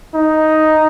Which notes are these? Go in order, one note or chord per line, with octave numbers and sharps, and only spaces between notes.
D#4